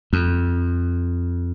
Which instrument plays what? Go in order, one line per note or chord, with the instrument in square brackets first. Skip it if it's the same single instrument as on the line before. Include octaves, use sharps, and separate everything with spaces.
[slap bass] F2